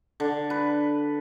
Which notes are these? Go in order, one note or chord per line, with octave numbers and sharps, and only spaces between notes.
D3
B4